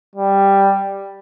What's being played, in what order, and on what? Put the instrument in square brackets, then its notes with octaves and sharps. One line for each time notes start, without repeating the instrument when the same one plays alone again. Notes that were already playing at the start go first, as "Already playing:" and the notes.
[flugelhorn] G3